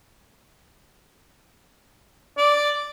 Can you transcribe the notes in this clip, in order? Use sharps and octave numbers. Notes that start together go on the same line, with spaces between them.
D5